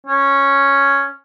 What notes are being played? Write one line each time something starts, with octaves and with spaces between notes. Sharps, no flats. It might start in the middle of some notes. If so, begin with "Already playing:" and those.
C#4